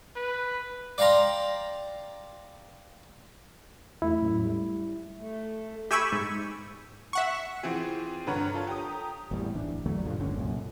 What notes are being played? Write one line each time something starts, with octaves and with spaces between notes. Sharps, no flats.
B4
D5 F5 G5 A#5 C6
E2 A3 E4
A2 F#3 C#4
G3
A3
G4 E5 G#5 B5 C#6 E6
G#2
E5 F#5 C#6
E3 F3 C4 G#4
G2 D3 B4 C#5 F#5 A#5
F4 A4 C#5
G4 A#5 D#6
G#1 E2 A2 G3
D1 E3 D4
E2 D3 F#3 A3
A#1 G2 D3 F3
F#1 G2 D3 C#4
C2 F#2 A#2